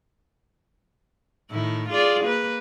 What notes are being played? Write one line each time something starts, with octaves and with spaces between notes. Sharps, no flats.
A2 D#3 E4
F4 G#4 D5
A#3 B4